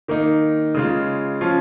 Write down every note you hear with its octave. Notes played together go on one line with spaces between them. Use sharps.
D#3 A#3 D#4
C#3 G#3 F4
F3 C#4 F4